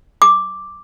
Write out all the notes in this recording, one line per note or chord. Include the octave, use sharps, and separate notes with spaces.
D6